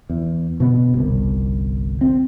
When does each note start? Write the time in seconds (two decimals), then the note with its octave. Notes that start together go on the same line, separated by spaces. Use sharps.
0.10 E2
0.60 B2 D3 B3
0.93 G1 C2
2.01 C4